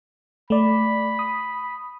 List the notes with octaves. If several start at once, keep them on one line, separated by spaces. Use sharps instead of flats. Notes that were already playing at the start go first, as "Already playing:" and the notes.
A3 D5 B5
D#6